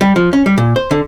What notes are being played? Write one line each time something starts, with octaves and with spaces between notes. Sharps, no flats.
G3
F3
C#4
G3
A#2
C5
D3